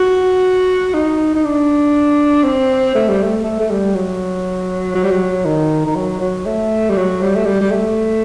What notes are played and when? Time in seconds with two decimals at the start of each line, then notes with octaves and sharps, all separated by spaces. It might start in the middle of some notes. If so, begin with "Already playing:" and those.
Already playing: F#4
0.94 D#4
1.35 D#4
1.45 D4
2.44 C4
2.95 A3
3.09 G3
3.23 A3
3.44 A3
3.59 A3
3.71 G3
3.94 F#3
4.95 F#3
5.03 G3
5.11 F#3
5.45 D#3
5.86 D#3
5.95 F#3
6.21 F#3
6.46 A3
6.90 G3
6.97 F#3
7.22 G3
7.36 A3
7.46 G3
7.61 G3
7.71 A3